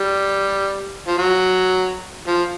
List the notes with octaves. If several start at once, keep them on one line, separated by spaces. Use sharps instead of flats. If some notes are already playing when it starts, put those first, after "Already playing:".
Already playing: G3
F3
F#3
F3